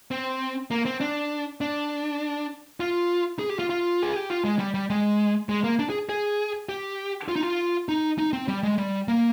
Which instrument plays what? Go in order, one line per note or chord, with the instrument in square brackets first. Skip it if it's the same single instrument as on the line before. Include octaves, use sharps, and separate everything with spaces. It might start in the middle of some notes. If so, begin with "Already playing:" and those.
[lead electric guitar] C4
A#3
C4
D4
D4
F4
G#4
G4
F4
F4
G#4
G4
F4
G#3
G3
G3
G#3
G#3
A#3
D4
G#4
G#4
G4
F4
D#4
F4
D#4
D#4
C4
G3
G#3
G3
A#3